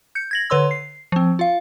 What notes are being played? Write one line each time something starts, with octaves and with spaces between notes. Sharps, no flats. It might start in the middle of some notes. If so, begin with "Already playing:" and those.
G6 C#7
G#6 A#6 F#7
D3 B4 C#5 C6 E6
C7
F3 C4
F4 F5